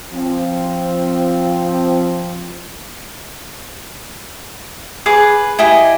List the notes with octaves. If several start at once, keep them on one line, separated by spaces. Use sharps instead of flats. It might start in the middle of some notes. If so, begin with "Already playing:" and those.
F3 C4
G#4 B4 D6
E4 G4 D#5 G#5